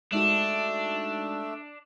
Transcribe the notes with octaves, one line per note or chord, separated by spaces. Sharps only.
G#3 A3 D4 D#4 F#4 E5